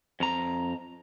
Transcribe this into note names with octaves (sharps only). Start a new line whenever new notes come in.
F2 A#5